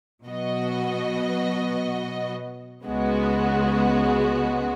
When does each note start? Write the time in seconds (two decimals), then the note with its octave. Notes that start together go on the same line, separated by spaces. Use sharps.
0.25 B2 F#3 B3 F#4 D#5
2.84 C#2 C#3 G#3 B3 F#4